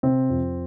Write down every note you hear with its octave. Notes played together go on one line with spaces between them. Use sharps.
C3 C4
F2